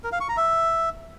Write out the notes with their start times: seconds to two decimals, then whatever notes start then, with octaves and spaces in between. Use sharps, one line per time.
0.04 A#4
0.12 F5
0.20 C#6
0.29 A#5
0.37 E5